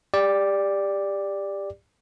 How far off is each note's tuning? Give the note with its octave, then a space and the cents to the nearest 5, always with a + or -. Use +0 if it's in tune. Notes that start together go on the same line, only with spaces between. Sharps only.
G4 +25 D5 +0